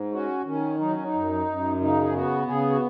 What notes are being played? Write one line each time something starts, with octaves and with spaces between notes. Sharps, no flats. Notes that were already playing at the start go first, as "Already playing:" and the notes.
Already playing: G#2
C#4 F#4
D#3 C#4
F#3 D#4
C#4
D#4
F#2
F#2
C#3 D#4
G#4
B3 F#4
C#3 G#4
F#4